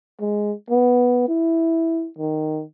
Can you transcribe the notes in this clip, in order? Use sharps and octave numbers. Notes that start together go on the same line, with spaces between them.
G#3
B3
E4
D#3